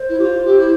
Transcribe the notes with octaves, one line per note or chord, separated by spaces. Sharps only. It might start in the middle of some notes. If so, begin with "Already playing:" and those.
Already playing: C5
E4
G4
F4
G4
E4